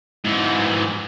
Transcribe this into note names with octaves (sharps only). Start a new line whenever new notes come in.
G#2 E3